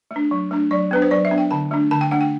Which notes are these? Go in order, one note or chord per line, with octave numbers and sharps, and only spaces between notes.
A3
D4
F#3
A3 D4
F#3 D5
B3 D4 B4
C5
F#3 D5
E5
B3 D4
G5
D3 A5
A3 D4
D3 A5
G5
A3 D4 F#5
G5